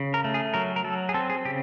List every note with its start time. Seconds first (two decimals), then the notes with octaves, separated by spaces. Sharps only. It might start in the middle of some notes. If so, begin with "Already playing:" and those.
Already playing: C#3
0.14 A#4
0.24 A3
0.34 G#4
0.54 F#3 A#4
0.76 A#4
0.84 F#3 A4
1.09 G#4
1.14 C4 A4
1.30 G#4
1.45 C#3 G4